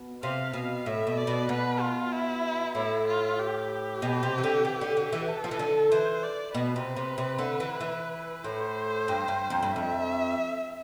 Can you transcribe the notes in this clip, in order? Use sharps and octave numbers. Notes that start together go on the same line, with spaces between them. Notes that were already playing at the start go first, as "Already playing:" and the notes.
Already playing: B2
C3 F5
B2 F5
A2 E5
B2
D5
B2
B2 B4
F4
E4
A2 E4
F4
G4
G4
B2
C3
E3
D3
E3
D3
D3
E3
A4
F3
E3
D3
E3 C5
D5
B2 B4
C3
C3
C3
D3
E3
E3
A2 C5
G2
G2
F2
G2
E5
F2